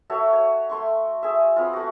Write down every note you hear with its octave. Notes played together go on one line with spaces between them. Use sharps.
F#4 A4 C#5 E5
C#5
A3 C6 C#6
G#4 E5
B3 C4 F4
A3 F#4